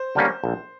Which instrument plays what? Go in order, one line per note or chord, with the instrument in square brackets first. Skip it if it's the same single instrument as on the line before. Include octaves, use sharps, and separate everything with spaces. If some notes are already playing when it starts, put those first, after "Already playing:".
Already playing: [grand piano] C5
[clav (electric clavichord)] D3 G3 A#3 C#4
A#1